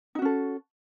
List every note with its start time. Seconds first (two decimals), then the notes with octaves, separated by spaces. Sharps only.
0.15 D#4
0.19 F#4
0.22 C#4
0.25 A4